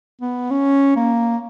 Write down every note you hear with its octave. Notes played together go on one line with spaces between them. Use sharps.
B3
C#4
A#3